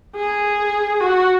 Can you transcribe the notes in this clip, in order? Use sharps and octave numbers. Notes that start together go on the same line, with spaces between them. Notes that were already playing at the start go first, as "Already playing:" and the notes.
G#4
F#4